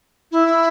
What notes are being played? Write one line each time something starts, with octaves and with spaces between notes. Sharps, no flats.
E4